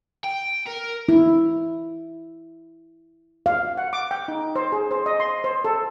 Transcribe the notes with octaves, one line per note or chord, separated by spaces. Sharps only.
G5
A#4
E4
F5
F#5
D6
G5
D#4
C5
G#4
C5
D#5
C6
C5
A4